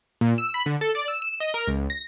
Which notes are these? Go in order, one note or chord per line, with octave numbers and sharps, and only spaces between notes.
A#2
E6
B5
D3
A4
D5
E6
E7
D#5
A#4
C#2
A#6